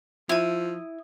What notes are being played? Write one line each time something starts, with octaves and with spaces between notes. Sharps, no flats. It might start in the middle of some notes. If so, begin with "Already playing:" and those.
F3 E4 D#6